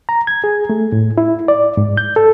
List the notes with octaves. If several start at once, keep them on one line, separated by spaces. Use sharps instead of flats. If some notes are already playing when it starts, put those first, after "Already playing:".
A#5
G#6
G#4
A3
A2
E4
D5
G#2
G6
A4